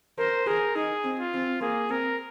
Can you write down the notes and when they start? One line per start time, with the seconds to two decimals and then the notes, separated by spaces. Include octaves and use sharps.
0.18 A#4 C5
0.47 G#4 A#4
0.75 D#4 G#4
1.04 C4
1.19 F4
1.34 C4
1.61 A#3 G#4
1.90 C4 A#4